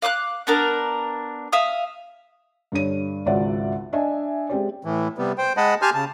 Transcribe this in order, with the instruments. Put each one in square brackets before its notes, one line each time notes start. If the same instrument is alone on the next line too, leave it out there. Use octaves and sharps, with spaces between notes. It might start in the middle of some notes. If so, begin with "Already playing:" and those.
[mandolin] F5 D6 D#6 F#6
B3 D4 A#4
E5 F5 D#6
[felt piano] G2 D3 C#5 D#7
G#1 C#2 F#4 D5 E5 F#5
D4 D#5 E5 G#5
G#3 C4 G4 D5
[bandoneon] A2 E3
C3 G3 B3
C5 G5
G#3 D#5 F#5 A5 B5
G4 G#5 A5 C6 F6 G6
C#3 A5